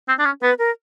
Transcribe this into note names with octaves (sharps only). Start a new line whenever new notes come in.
C4
D4
C#4
B3 B4
A#4